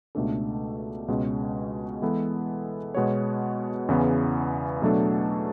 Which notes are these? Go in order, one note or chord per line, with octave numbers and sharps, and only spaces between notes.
C#2 B2 A3 D4 A4
C#2 B2 G#3 C#4
E3 G#3 B3 E4 A4
B2 G#3 B3 F#4 C#5
E2 C#3 E3 B3
B2 F#3 A3 D4 A4